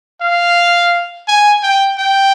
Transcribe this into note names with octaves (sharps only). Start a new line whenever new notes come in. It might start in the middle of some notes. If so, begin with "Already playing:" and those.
F5
G#5
G5
G5